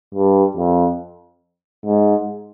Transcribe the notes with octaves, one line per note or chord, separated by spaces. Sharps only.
G2
F2
G#2